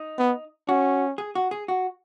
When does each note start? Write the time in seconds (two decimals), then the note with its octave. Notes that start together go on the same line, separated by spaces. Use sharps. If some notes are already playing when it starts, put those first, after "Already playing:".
Already playing: D#4
0.18 B3
0.68 C#4 F#4
1.18 G#4
1.35 F#4
1.51 G#4
1.68 F#4